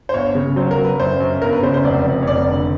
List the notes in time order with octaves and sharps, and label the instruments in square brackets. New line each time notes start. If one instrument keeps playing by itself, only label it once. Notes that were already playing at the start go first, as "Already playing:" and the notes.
[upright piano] C5
[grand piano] G1 [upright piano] C#5
[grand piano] C#3
[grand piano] F#3 [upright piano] C5
[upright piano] A#4
[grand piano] F#3
[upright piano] B4
[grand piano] F#2 [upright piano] C5
[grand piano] F#2
[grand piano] G1 [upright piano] A#4
[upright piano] B4
[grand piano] C#3 [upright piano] C5
[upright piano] C5
[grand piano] F1 [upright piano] D5
[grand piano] F2
[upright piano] C#5
[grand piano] F1 [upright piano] D5
[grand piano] D3